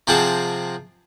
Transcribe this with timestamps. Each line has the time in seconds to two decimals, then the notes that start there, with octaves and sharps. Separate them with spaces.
0.07 C3 F3 C4 G#4 F#5 A5